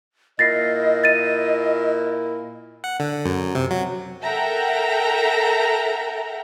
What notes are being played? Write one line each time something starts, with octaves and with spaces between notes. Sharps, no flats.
A#2 E4 D#5 A6 A#6 C7
A6 D#7
F#5
D3
F#2
C3
F#3
A4 A#4 E5 F#5 G5 A#5